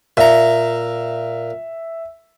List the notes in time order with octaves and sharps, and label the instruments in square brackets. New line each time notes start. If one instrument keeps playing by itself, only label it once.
[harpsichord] A#2 A#5 [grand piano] E5